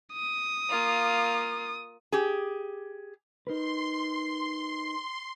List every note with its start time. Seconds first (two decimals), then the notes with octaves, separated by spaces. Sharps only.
0.13 D#6
0.69 A#3 F4
2.12 G4 G#4
3.47 D#4 A#4 B4 C6